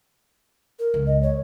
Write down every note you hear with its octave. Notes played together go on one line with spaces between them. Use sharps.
A#4
C#2
D#5
C#5